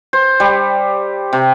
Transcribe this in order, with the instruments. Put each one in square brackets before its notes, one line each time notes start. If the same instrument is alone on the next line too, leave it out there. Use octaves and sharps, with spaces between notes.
[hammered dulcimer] C5
G3
C3